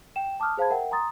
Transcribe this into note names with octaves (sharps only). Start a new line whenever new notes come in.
G5 E7
A5 D6 D#6 F6 F#6
G#4 C5 F5 A5 B5 G#6
A#4 E5 F#5 G5
G#5 A#5 C6 D#6 A6